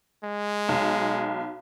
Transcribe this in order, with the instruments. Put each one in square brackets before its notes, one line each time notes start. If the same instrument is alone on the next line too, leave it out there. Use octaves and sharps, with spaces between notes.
[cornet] G#3
[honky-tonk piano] B1